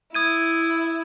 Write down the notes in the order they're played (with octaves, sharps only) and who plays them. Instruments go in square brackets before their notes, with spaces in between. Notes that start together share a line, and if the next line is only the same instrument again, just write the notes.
[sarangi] E4 [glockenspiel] D#6 G#6 D#7